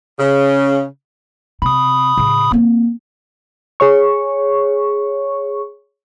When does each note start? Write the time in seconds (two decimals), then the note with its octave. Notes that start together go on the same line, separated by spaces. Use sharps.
0.19 C#3
1.62 C3 B5 D#6
2.17 A2 C#3
2.51 A#3 C4
3.80 G#4 C#5 C#6